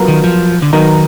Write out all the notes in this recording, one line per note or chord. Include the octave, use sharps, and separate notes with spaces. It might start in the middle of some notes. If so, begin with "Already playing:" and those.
Already playing: F#3 B3 F4 A#4
D#3
F3
D3
D#3 F#3 B3 D#4 A#4